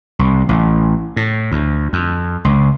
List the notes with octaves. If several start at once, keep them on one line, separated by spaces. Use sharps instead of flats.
C2
A1
A2
D2
F2
C#2